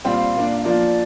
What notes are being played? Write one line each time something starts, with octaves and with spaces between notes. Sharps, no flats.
A#2 G3 C4 F4 F5 G5
A#2 A#3 D4
F5
F3 A#3 F4 D5